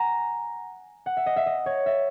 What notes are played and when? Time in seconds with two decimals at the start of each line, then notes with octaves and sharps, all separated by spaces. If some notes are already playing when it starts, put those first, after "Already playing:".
Already playing: F#5 G#5 A#5
1.06 F#5
1.17 E5
1.26 D#5
1.36 E5
1.46 D#5
1.66 C#5
1.86 E5